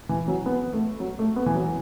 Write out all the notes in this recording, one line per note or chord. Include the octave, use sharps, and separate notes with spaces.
E3
F#3
B3
A3
F#3
A3
B3
E3
F#3